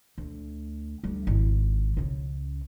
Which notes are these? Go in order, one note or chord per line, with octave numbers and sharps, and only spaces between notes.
D2
D2 G3
G#1 E4
C#2 C#3